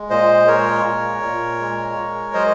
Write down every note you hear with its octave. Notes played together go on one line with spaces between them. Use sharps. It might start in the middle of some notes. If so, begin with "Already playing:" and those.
Already playing: G#3
A#2 C5 D#5
G#3 A#4 C#5
A#2
A#2
G#3
G#3
F#3 C5 D#5